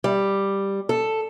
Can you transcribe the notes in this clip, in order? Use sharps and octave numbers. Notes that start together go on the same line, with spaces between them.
G3
A4